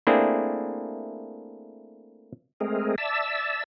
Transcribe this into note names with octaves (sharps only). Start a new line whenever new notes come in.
A3 A#3 C4 D4 E4 G#4
G#3 A3 C4 G#4 A#4
D5 E5 A5 E6